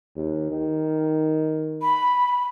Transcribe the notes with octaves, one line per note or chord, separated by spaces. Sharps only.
D#2
D#3
B5